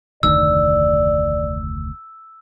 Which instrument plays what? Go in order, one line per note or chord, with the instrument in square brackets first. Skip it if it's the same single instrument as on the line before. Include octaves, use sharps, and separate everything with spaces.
[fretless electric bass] F1 D2 D#3 [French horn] D5 [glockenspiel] E6